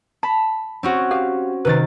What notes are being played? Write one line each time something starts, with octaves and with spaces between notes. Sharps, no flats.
A5 B5
C4 C#4 F#4
G4 F5
C3 D#3 B4 A6